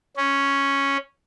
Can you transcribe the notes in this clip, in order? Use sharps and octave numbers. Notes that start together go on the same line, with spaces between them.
C#4